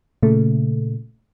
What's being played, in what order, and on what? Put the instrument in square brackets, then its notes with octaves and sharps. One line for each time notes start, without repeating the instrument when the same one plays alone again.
[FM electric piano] A#2 C#3 A3